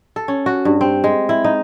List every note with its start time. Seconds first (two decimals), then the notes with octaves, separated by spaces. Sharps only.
0.16 A4
0.28 C#4
0.46 F#4
0.65 G2
0.81 C4
1.04 G#3
1.29 E4
1.44 D#4